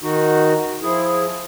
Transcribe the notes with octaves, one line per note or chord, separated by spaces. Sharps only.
D#3 D#4 F#4
F3 E4 G#4